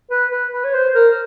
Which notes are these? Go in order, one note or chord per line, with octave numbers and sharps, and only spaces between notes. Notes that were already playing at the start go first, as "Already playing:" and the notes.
B4
B4
B4
C#5
C5
A#4